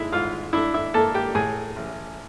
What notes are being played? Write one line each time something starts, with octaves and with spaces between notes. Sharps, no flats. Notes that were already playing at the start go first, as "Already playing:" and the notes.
Already playing: G#3 D#4 E4 E5
G#2 F4 F5
D4 E4 E5
E4 E5
A#3 A4 A5
G4 G5
A2 G#4 G#5
A1